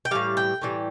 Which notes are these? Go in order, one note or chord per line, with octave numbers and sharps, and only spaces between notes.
G5
A2 E3 G3 F5
G5
A2 E3 G3